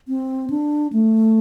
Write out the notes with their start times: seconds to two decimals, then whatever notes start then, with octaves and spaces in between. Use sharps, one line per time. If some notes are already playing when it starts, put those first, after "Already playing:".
0.08 C4
0.50 D4
0.93 A3